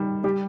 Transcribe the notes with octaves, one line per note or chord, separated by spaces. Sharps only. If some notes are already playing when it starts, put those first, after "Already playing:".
Already playing: D#3 G3
G3 G4